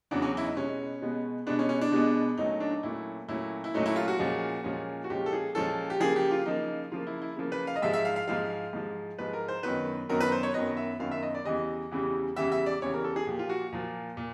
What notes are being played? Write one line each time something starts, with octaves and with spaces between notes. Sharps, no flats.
E2 C#3 F#3 D4
C#4
E4
D#4
B2 G#3 B3 C#4
B2 G#3 B3
B2 G#3 B3 D4
C#4
C#4
D4
B2 G#3 B3
A#2 F#3 A3 C#4 D#4
D4
D#4
A#2 F#3 A3 C#4 E4
A#2 F#3 A3 C#4 E4
E4
A#2 F#3 A3 C#4 D#4
E4
F4
F#4
A#2 F3 G#3 C#4
A#2 F3 G#3 C#4
F#4
A#2 F3 G#3 C#4 G4
A4
G#4
A#2 F3 G#3 C#4 A4
G4
C#3 F3 A#3 G#4
G4
F4
C#3 F3 A#3 D#4
C#3 F3 A#3 F4
E4
E4
C#3 F3 A#3
B4
F5
D#5
G#2 F3 G#3 E5
E5
F5
F5
G#2 F3 G#3 F5
G#2 F3 G#3
G#2 F3 G#3 B4
A#4
C5
F#2 D#3 F#3 B3 B4
F#2 D#3 F#3 B3 A#4
B4
C5
C#5
F#2 D#3 F#3 B3 D#5
E5
F#2 D#3 F#3 B3 F5
E5
D#5
D5
E2 C#3 E3 G3 D#5
E2 C#3 E3 G3
E2 C#3 E3 G3 E5
E5
D5
E2 C#3 E3 G3 C#5
A#4
A4
G#4
A#2 F3 A#3 G4
F4
F#4
A#2 F3 A#3
A#2